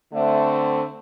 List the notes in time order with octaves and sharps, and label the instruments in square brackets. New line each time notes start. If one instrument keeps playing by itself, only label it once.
[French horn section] D3 A3 C4